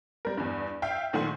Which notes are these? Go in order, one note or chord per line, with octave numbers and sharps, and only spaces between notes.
G3 A#4
E2 G2
E5 F5 G5 G6
A#1 D#3 A3 F#5 G#5 C6